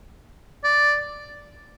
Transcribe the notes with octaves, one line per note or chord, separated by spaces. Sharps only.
D5